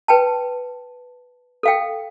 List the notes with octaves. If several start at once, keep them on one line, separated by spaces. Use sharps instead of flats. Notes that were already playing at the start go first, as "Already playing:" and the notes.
B4 G5 A5
A4 F5 G5